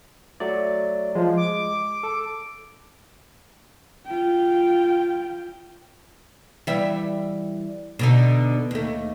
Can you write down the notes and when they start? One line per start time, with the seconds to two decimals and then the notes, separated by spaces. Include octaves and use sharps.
0.40 F#3 A3 D5
1.15 F3 G#3
1.37 D6
2.03 A4
4.06 F4 G5
6.67 E3 G3 E5
7.99 B2 D3 D#4
8.71 D#2 A3